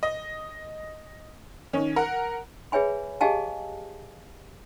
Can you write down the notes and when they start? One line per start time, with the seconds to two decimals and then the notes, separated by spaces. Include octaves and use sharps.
0.03 D#5
1.73 D#3 C#4
1.96 A#4 F#5
2.72 G#4 B4 C#5 E5 G#5 B5
3.21 G4 G#4 D#5 F5 G#5 A5